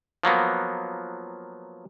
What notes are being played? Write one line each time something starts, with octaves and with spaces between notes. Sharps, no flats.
F3 F#3 A#3 B3